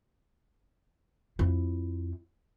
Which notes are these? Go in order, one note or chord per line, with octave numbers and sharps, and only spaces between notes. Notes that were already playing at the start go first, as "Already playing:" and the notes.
F2 E4